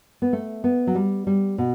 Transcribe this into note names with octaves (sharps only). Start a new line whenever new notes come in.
B3
A3
B3
F#3
G3
G3
B2